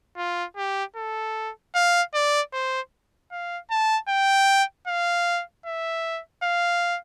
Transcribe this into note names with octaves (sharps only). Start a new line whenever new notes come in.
F4
G4
A4
F5
D5
C5
F5
A5
G5
F5
E5
F5